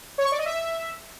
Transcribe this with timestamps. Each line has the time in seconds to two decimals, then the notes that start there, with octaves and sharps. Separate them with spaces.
0.18 C#5
0.25 C#6
0.32 D5
0.39 D#5
0.46 E5